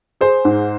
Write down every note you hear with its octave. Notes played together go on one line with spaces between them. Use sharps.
G#4 C5
G#2